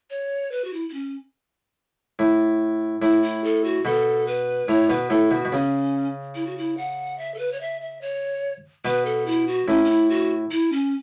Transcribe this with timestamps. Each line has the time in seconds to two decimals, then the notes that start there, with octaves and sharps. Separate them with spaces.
0.10 C#5
0.52 B4
0.64 F#4
0.73 E4
0.89 E4
0.93 C#4
2.19 A2
3.02 A2 E4
3.23 E4
3.44 A4
3.64 F#4
3.85 B2 A4
4.27 B4
4.68 A2 C#5
4.90 B2 B4
5.10 A2 A4
5.31 B2 F#4
5.45 B2
5.52 C#3 C#4
6.35 E4
6.47 F#4
6.58 E4
6.77 F#5
7.18 E5
7.34 A4
7.39 B4
7.52 C#5
7.61 E5
7.81 E5
8.01 C#5
8.85 B2 B4
9.06 A4
9.26 E4
9.48 F#4
9.68 A2 C#4
9.85 C#4
9.89 E4
10.10 F#4
10.51 E4
10.72 C#4